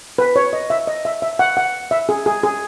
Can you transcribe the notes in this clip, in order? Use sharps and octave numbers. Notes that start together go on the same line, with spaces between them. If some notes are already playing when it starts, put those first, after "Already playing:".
B4
C#5
D#5
E5
D#5
E5
E5
F#5
F#5
E5
G#4
G#4
G#4